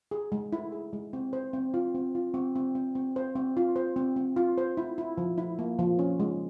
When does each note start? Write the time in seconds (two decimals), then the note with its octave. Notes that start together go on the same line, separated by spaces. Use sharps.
0.11 G#4
0.32 G#3
0.53 E4
0.72 G#4
0.93 G#3
1.13 C4
1.33 C5
1.53 C4
1.74 F4
1.95 C4
2.15 F4
2.34 C4
2.55 C4
2.75 C4
2.95 C4
3.16 C5
3.36 C4
3.57 F4
3.76 C5
3.96 C4
4.16 C4
4.36 F4
4.58 C5
4.77 E4
4.98 E4
5.18 F3
5.38 E4
5.59 A#3
5.79 F3
5.99 C#4
6.20 G#3